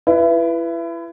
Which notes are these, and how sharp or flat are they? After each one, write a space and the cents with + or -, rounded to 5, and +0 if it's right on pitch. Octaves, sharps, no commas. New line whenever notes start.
E4 +30 B4 +0